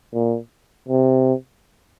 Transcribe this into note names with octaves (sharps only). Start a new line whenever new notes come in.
A#2
C3